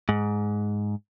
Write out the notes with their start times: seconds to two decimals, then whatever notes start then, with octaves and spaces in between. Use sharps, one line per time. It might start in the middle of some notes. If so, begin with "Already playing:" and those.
0.09 G#2